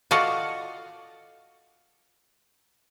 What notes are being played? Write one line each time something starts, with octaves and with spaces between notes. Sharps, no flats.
F4 F#4 A4 D5 D#5 F5